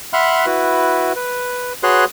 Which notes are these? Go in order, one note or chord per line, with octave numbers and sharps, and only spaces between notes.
E5 F#5 B5 C6 F6 F#6
E4 F#4 B4
B4
F#4 G#4 B4 C#5 C6 F#6